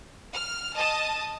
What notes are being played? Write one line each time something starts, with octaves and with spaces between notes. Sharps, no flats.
F6
D#5 A5 D#6